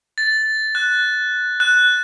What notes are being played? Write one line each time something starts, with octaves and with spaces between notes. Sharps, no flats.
A6
F#6
F#6